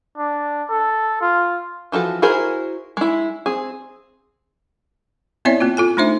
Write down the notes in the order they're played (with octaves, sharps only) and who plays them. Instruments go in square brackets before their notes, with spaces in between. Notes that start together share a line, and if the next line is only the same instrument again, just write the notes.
[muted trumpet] D4
A4
F4
[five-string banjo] E3 F3 F#4 A4
E4 F#4 G#4 A#4 C5
G#3 E4
C4 G#4
[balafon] B3 C4 E4 C#5 D5 E5
A#3 C4 F4
F4 A4 G#5
A3 D4 D#4 C5 E5